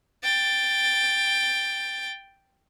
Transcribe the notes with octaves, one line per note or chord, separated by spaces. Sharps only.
G5 A6